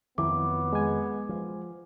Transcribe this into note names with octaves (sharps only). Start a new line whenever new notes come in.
F2 D#3 F#3 B3 E4 D6
G#3 G#5
F3